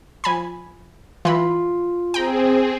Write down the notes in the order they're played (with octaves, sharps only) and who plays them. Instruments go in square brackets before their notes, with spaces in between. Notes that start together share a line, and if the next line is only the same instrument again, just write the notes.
[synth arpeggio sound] F3 G#5 B5
[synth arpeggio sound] E3 B5 [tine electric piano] F4
[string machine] C4 G#4 [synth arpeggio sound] G5 A#5